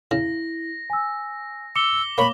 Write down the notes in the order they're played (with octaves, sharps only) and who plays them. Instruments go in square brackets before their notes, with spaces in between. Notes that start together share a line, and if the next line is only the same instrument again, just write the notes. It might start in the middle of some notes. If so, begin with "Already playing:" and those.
[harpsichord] C#3 [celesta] E4 [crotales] A#6
[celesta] G#5 E6
[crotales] D6 G7 [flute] E6 [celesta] C#7
[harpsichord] A#3 C#5 [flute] B5